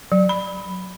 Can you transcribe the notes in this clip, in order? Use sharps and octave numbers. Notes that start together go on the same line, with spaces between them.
F#3
B5